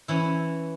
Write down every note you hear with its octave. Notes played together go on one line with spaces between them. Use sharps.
E3 C#4 E4